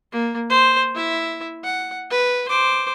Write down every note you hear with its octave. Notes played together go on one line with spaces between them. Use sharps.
A#3
C5
E4 E5
F#5
B4
C5 D6